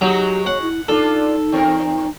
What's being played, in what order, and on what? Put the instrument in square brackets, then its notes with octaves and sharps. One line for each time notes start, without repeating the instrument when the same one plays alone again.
[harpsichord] F#3 [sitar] G#3 D#4 F#4 [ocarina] G4
[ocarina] C#5 [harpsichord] F#5
[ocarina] E4
[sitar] D4 F4 [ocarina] D#4 [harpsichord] A4
[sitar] E2 C4 A#4